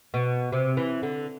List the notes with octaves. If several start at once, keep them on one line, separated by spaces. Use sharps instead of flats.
B2
C3
E3
D3